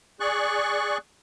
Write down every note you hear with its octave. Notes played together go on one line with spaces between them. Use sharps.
G#4 D5 C#6 F#6